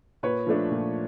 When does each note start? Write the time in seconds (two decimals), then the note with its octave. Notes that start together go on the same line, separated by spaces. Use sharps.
0.23 A#2 B4 C#5
0.47 F3 A3 D4
0.71 A#2